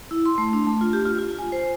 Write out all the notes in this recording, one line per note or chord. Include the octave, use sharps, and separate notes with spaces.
E4
C6
A3
D4
A3
F4
G4
F4
F4
G#5
C5